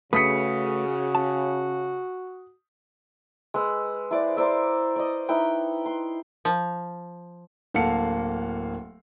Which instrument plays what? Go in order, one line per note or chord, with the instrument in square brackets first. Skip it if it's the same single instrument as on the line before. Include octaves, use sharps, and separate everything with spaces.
[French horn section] C#3 [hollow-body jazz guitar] A3 B4 [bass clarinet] F#4 [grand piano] D#6 B6 C#7
[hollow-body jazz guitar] A5
[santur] G#3 B4 E6
E4 B4 C5 D5
A#4 C5 D5 E5
D5 D#5
D#4 E4 B4 G5
C6
[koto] F3
[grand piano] D1 A#3 A4 F5 F#5 C#7